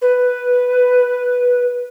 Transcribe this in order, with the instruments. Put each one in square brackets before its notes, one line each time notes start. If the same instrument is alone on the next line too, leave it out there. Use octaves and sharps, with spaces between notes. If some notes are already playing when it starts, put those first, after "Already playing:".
[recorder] B4